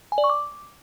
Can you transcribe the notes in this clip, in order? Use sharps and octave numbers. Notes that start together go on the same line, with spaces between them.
G#5
D5
C#6
D6